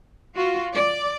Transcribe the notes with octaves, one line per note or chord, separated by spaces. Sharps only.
F4 F#4
D5